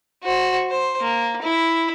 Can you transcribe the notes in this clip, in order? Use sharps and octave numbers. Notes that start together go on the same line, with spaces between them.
F#4 C5
C5
A#3
E4